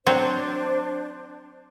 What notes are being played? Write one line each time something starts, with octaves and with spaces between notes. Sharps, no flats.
F#3 C4 D4 C5